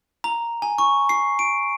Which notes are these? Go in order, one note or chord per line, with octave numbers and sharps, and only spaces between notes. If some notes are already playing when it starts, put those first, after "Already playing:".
A#5
G#5
C#6
C7
D7